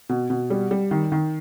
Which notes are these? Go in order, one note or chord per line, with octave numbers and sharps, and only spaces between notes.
B2
B2
G3
G3
D#3
D#3